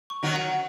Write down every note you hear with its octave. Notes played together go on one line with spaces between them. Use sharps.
C#6
D#3 F#3
F#5